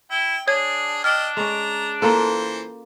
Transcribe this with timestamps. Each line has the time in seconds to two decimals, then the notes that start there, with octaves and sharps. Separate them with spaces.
0.11 E4 G5
0.48 D4 G#4 C#5 G#6
1.04 D4 D#5 G5 F6
1.37 G#3 C#4 A#5
2.02 E3 A#3 F4 A4 C5